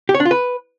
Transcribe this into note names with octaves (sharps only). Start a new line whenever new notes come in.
G4
C#5
D4
F4
B4